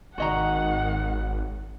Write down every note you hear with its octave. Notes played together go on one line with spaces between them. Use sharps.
G#1 D#3 F#4 D#5 F#5 A#5